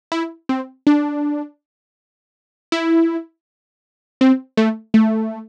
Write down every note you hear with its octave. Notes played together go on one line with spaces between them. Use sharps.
E4
C4
D4
E4
C4
A3
A3